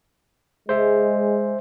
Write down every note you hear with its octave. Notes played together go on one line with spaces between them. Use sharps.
G#3 C5 E5